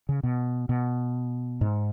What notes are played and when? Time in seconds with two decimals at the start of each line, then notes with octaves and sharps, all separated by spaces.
0.09 C#3
0.23 B2
0.69 B2
1.61 G#2